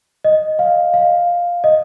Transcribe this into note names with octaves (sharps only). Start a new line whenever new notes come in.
D#5
F5
F5
D#5